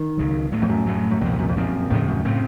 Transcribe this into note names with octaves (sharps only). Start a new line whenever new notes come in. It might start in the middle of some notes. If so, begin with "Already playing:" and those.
Already playing: D#3
C#2 C#3 F#3
A2 F#3 A3
F2
F#2
A2 F#3 A3
F#2
C2 F2 A#2 F3
F#2
F2
F#2 A#2 F3 C4
D#2 A2 C#3 F3 A3
F#2
A2 C#3 A3 C4